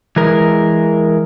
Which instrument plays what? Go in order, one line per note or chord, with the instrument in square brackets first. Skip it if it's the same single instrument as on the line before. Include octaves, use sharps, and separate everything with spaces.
[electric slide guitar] E3 G#3 A#4